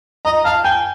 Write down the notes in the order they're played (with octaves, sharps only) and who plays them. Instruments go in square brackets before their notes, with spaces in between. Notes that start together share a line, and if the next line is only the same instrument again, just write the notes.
[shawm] D#5 [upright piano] A#5
[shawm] F5 [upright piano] A5
[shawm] G5 [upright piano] G#5